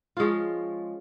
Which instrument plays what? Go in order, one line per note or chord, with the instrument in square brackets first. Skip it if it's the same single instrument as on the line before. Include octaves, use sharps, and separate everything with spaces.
[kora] F3 G#3 C#4 F4